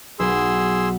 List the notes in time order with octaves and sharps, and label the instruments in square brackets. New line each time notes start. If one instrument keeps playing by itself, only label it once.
[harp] B1 [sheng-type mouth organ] G#4 C6 E6